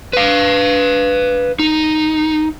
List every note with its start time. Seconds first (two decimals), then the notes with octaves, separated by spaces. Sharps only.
0.13 B4 F5
1.59 D#4